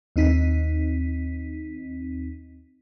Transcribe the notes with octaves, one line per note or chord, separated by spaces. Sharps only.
D#2 C4 D#4 B6